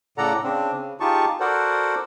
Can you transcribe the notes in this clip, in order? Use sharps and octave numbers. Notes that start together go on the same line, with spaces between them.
A2 C#3 A4 D5 F#5 A#5
C#3 C4 D4
C#3
D#4 F4 G4 G#4 A5 C#6
F#4 A4 A#4 C5 D5 F#5